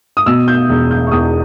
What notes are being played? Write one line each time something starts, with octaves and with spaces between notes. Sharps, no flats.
D#6
B2 E6
G6
E1
G6
C#6
E2 D#6